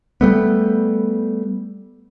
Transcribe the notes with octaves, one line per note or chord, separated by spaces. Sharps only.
G3 A3 B3